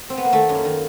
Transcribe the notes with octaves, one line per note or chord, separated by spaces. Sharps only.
C4
B3
A#3
D#3 A3
F#2
A#3
D#3